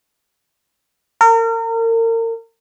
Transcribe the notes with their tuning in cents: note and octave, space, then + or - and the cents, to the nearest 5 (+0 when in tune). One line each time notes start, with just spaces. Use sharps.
A#4 -35